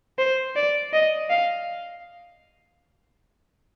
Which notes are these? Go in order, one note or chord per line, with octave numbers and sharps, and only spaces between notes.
C5
D5
D#5
F5